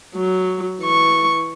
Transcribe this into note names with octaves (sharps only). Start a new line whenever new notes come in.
F#3
E3 C#6